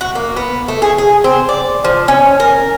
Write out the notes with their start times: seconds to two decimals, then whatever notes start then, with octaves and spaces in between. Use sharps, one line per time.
0.01 F#4
0.15 A#3
0.36 B3
0.68 A3
0.82 G#4
0.98 G#4
1.24 C4
1.49 D5
1.85 F3
2.08 C#4
2.40 A#4